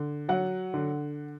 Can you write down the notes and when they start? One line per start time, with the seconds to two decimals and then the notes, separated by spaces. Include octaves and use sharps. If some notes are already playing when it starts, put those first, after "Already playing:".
Already playing: D3
0.29 F#3 F#5
0.74 D3